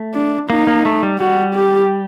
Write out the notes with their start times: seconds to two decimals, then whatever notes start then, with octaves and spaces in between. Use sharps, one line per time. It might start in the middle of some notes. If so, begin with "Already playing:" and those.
Already playing: A3
0.14 D4
0.50 A#3 D#4
0.67 A#3
0.85 A3
1.03 G3
1.19 G3 F#4
1.55 G4